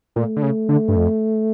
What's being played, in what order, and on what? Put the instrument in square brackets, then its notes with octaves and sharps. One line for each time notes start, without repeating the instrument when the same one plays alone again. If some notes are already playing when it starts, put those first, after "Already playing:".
[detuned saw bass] A#2 [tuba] A3
[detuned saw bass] D3
C#3
D3
G2
F2